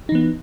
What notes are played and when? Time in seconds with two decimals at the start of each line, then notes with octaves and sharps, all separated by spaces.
0.09 D#4
0.12 E3
0.15 B3